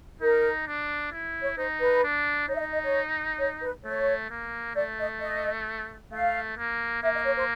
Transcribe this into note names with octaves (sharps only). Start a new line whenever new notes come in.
D#4 A#4
D4
E4
C#5
D#4 C5
B4
D4
D#4 C#5
E5
D#5
D#5
C#5
C#5
B4
A3 C#5
A#3
A3 D5
D#5
D#5
A3 F5
A#3
A#3 E5
D#5
C#5
C5